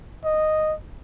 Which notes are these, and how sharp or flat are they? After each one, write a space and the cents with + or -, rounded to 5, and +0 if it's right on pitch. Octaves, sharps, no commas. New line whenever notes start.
D#5 -5